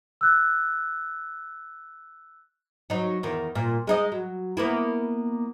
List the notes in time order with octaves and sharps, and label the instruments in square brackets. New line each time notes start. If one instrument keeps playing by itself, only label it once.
[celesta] E6 F#6
[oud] F#3 D#4
E2 D#3
A#2
G#3 D#4 D#5
F#3
A#3 B3 E4